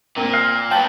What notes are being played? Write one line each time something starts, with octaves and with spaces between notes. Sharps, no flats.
A#2 A#3 C4
F5
F#3 B3 G5 A5